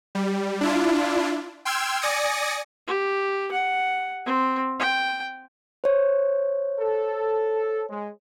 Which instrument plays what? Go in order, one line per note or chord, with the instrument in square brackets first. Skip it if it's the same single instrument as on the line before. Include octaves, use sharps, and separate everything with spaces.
[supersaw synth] G3
D4 E4 F4
G5 C6 E6 F6 G#6
D5 G#5 D#6 A#6 C#7
[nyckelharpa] G4
F#5
C4
G5
[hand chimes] C5 C#5
[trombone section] A4
G#3